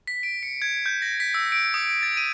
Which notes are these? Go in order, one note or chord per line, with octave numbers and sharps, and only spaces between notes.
B6
D7
C#7
G#6
G6
A#6
B6
E6
D7
D#6
A6
D#7